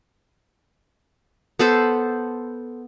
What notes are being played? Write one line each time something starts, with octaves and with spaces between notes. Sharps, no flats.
B3 A4 C5